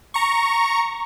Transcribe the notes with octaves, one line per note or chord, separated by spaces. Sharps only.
A#5 C#6